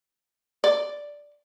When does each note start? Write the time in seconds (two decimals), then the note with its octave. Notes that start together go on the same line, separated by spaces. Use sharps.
0.64 D5